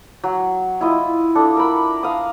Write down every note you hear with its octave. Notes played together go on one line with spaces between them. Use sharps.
F#3
E4 F4 D#5
D4 A4
A#4 B5
F5 D#6